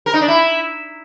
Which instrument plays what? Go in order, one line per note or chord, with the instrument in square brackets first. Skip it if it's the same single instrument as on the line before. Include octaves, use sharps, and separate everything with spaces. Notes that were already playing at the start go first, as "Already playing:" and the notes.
[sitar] A#4
D#4
D4
E4